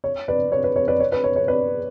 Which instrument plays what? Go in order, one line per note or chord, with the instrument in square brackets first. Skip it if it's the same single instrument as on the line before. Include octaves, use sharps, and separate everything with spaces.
[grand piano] C#5
B4 D5
C#5
B4
C#5
B4 D5
C#5
B4
C#5
C#5
B4 D5